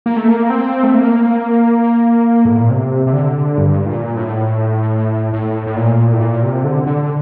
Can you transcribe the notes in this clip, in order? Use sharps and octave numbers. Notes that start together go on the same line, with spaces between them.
A#3
A3
A#3
C4
A3
A#3
A2
A#2
C3
C3
D3
G2
A#2
A2
A2
A2
A#2
A2
A#2
C3
D3
D3